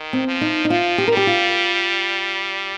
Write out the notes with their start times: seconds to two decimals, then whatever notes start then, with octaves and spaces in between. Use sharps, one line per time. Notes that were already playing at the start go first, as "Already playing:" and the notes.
Already playing: D#3
0.13 C4
0.28 F3
0.41 D#4
0.65 D#4
0.70 F3 F4
0.98 G4
1.08 A#4
1.13 G3 G4
1.27 F4